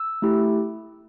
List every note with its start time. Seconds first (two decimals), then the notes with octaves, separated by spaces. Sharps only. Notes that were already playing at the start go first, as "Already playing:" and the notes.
Already playing: E6
0.22 A3 E4 G4